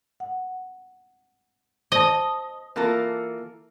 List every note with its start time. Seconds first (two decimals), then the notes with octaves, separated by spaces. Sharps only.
0.20 F#5
1.92 C5 D#5 A5
2.76 E3 A#3 F4 A4 A#4